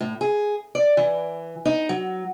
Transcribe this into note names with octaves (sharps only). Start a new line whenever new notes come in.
A2
G#4
D5
E3
D#4
F#3